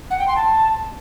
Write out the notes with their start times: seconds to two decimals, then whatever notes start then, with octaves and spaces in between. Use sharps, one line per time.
0.10 F#5
0.19 G5
0.27 C6
0.36 A5